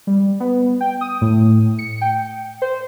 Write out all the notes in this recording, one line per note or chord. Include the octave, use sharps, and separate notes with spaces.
G3
B3
G5
D#6
A2
C#7
G5
C5